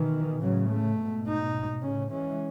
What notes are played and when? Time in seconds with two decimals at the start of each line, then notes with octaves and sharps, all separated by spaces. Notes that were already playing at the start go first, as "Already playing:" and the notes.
Already playing: B2 D#3 E3
0.41 A2 C#3 F#3
0.70 A3
0.98 G#2 B2
1.27 D#4
1.82 A2 C#3 C#4
2.11 E3 G#3 C#4